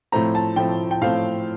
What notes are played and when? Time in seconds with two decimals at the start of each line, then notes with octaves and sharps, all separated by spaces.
0.12 A2 F3 A3 C4 A#5
0.35 A5
0.56 A2 F3 A3 C4 G5
0.91 G5
1.01 A2 F3 A3 C4 F5